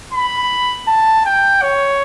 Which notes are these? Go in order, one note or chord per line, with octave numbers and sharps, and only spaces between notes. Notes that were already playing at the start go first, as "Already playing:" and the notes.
B5
A5
G5
C#5